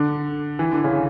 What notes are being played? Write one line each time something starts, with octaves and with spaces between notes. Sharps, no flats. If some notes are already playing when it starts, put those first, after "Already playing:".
Already playing: D3
E3
D3
C#3